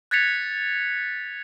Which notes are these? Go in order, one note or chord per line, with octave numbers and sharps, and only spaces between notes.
F#6 G#6 A6 B6 C#7 F7